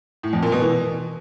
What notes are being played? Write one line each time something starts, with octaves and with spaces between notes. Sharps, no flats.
A2
F2
A#2
B2
E3